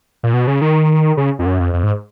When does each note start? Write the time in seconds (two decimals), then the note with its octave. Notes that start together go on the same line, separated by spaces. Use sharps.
0.23 A#2
0.33 B2
0.47 C#3
0.61 D#3
1.17 C#3
1.39 F2
1.46 F#2
1.60 F2
1.74 F2
1.83 G#2